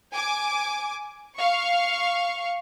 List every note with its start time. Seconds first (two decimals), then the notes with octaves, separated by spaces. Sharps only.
0.15 G#5 D6
1.37 F5 C#6